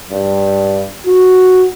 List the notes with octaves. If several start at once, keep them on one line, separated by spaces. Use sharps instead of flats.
G2
F#4